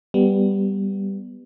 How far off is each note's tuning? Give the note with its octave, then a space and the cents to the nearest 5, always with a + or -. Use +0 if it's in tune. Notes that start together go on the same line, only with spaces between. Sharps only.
G3 +0 B3 +0